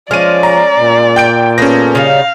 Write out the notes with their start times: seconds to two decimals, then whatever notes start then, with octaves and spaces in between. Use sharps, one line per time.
0.11 F3 G#3 C#4 D5 F6 D#7
0.43 A#5
0.80 A#2
1.16 G5 G6 D7
1.58 B3 C#4 G#4 A4 A#6
1.95 C#3 G3 D#4 F5